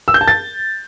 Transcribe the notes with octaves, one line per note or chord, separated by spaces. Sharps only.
E6
G6
A5
A6